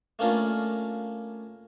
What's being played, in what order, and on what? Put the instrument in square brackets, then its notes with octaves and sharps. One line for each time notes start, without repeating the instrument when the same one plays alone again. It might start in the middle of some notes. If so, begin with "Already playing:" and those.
[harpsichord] A3 A#3 C#4 D4 F4 A#4